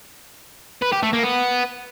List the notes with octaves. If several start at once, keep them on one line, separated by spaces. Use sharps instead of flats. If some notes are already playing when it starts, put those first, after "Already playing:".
B4
G4
A3
A#3
B3